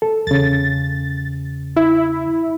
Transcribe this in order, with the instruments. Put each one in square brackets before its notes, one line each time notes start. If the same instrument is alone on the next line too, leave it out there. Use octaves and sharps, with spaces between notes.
[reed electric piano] A4
[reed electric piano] E2 C#3 [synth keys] A6
[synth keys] E4